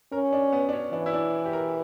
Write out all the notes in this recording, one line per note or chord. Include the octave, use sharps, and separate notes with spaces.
C#4 A#4
D4
B3
D4
C#4
E3 D4
E4
D4
G4
A#4